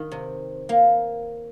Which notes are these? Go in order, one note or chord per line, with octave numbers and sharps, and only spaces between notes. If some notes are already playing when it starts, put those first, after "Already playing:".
Already playing: D#3
C3
A#3